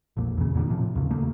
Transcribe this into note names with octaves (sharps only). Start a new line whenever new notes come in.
A#1 F2 A#2
E2 C#3
A#2 D3 D#3
A2 C3 F3
D#2 C#3
D#2 C#3 A3 A#3